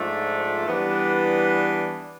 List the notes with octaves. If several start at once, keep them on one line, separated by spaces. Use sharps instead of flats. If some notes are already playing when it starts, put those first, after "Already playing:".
Already playing: G#2 F3 A3 D4 F4
E3 G3 B3 D4